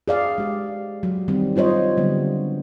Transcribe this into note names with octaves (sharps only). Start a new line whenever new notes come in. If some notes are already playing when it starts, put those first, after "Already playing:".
G#4 D5 F5
G#3 G4
F#3
D#3 G3 C4
E4 F4 C5 C#5 D#5
D3 F#3 G3 B3